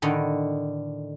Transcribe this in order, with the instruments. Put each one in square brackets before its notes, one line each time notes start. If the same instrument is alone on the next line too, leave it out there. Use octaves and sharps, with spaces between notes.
[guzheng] A2 D3 D#3